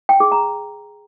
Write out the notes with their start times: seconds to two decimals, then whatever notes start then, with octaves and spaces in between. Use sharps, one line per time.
0.09 G5
0.20 G#4
0.32 A#5